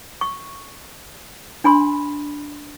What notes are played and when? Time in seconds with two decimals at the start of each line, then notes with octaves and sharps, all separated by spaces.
0.21 C#6
1.64 D4 G#5 B5 C6